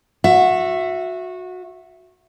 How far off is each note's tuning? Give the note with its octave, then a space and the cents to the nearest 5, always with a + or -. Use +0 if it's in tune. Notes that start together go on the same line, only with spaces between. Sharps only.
F#4 -20 E5 +10